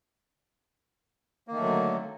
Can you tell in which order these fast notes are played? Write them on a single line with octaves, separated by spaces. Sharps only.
A#3 D#3 A3 F#3 D3